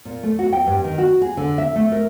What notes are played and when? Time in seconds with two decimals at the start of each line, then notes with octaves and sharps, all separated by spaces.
0.05 A#2
0.23 A3
0.39 F#4
0.53 G5
0.67 G2
0.84 D#3
0.98 F#4
1.21 G#4
1.37 D3
1.58 E5
1.76 A3
1.92 A#4